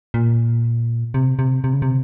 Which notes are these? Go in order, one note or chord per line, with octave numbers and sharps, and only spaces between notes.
A#2
C3
C3
C3
C#3
C3